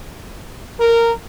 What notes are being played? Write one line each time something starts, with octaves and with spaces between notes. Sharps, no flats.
A#4